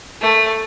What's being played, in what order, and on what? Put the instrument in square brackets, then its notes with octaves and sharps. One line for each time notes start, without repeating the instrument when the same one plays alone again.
[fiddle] A3